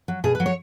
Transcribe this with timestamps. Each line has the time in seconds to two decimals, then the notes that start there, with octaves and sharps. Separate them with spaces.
0.08 F#3
0.24 B2 G#4
0.35 B4
0.40 F#3
0.46 C#5